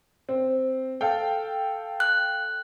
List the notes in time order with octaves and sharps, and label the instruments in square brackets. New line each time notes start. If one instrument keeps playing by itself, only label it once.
[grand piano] C4
A4 F5 G5
[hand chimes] F#6